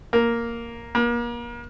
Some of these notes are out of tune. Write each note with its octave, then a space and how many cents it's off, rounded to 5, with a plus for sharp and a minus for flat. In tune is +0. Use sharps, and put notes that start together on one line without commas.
A#3 +0
A#3 +35